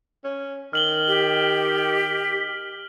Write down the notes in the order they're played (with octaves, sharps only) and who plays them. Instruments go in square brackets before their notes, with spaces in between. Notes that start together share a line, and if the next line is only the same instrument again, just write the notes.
[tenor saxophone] C#4
[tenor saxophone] D#3 [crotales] F6 F#7 G7
[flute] G4